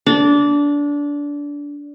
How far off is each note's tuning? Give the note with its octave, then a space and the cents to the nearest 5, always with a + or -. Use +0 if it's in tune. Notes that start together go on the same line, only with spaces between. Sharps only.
D4 -20